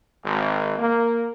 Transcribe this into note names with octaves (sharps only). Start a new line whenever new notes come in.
G#1
A#3